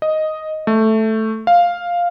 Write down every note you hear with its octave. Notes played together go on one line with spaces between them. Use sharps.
D#5
A3
F5